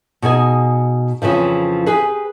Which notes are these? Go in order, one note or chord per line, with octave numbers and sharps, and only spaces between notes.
B2 D#4 G#4 G#5
F2 C#3 E3 F3
G4 G#4 B4